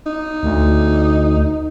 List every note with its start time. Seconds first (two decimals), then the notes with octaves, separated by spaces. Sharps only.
0.07 D#4
0.43 D2